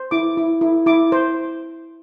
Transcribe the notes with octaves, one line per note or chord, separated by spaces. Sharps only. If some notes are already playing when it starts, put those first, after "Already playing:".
Already playing: C5
E4 D6
E4
E4
E4 D6
C5